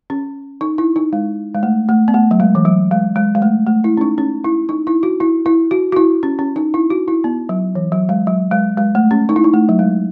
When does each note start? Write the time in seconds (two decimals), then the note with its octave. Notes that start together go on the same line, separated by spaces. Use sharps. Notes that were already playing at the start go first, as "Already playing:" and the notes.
0.10 C#4
0.61 D#4
0.78 E4
0.96 D#4
1.13 G#3
1.54 G#3
1.63 A3
1.89 A3
2.08 B3
2.14 A3
2.31 F#3
2.40 G#3
2.55 E3
2.65 F#3
2.91 G#3
3.16 G#3
3.35 G#3
3.42 A3
3.67 A3
3.84 E4
3.97 C#4
4.01 D#4
4.18 C#4
4.44 E4
4.69 D#4
4.87 E4
5.03 F#4
5.20 E4
5.46 E4
5.71 F#4
5.92 F#4
5.96 E4
6.23 C#4
6.39 C#4
6.56 D#4
6.74 E4
6.90 F#4
7.08 E4
7.24 B3
7.49 F#3
7.75 E3
7.92 F#3
8.09 G#3
8.27 F#3
8.51 G#3
8.78 G#3
8.95 A3
9.11 C#4
9.29 D#4
9.36 E4
9.44 D#4
9.54 A3
9.69 F#3
9.79 G#3